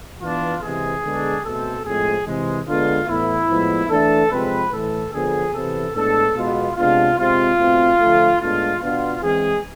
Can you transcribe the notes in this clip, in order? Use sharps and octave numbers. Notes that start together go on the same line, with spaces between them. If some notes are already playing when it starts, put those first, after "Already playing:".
E3 B3 D4 F4
C3 E3 G#3 G#4
D3 G#3 B3 D4
B2 A3 C4 A4
A2 F3 G#3 C4 G#4
C3 E3 G#3
D3 G#3 B3 D4 F4
A2 E3 B3 E4
A2 F3 G#3 B3
E3 A3 D4 A4
C3 F3 G#3 C4 B4
A2 E3 A3 A4
D3 F3 B3 G#4
C3 E3 B3 A4
A2 G#3 B3 D4 A4
B2 G#3 B3 F4
C3 G#3 B3 D4 F4
C3 G#3 C4 F4
B2 A3 C4
D3 F3 A3
A2 G#3 B3 D4 F4
B2 B3 D4 F4
E3 G#3 C4 G#4